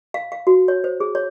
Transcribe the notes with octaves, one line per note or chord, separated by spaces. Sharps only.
F5
F5
F#4
C#5
C5
G#4
C#5